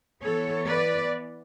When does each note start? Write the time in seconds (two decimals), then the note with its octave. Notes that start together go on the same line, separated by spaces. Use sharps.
0.22 E3 B3 A4 C#5
0.68 B4 D5